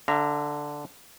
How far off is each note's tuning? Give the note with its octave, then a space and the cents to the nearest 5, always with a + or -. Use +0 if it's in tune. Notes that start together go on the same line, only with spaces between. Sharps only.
D3 +0 E5 +45 A#5 -5